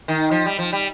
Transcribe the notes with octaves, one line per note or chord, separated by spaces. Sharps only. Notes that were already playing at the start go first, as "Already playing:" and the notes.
D#3
F3
G3
F3
G3